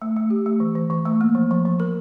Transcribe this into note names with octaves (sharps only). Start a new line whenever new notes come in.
A3
A3
G4
A3
E3
E3
E3
A3
A#3
F3
F3
F3
A#4